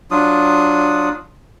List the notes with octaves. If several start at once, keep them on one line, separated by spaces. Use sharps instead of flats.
F#3 D4 F4 D#6